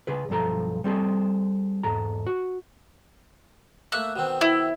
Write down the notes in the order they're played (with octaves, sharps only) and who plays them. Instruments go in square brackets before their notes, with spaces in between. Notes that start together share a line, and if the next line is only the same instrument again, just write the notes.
[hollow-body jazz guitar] C#3 G#4 B4
B1 G2 F3 A4 A#5
G3 C4 G#4 A4
E2 G#2 A4 A#5
F#4
[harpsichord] A3 A#3 E5 [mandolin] F#6
[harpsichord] B2 D#3 C4
[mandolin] E4